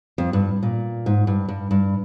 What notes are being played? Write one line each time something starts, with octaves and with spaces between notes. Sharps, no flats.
F2
G2
A#2
G#2
G2
G2
G2